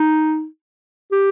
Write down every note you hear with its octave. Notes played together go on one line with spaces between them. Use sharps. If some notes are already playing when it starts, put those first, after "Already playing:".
Already playing: D#4
G4